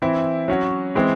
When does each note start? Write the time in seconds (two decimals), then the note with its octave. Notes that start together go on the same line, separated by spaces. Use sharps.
0.02 E3 C4 E4
0.48 F#3 C#4 F#4
0.95 E3 G#3 C4